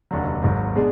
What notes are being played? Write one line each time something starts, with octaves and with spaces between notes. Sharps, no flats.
F1 D#2 D3 F#3
G#1 G#2 F#3
B2 G#3 D4 G#4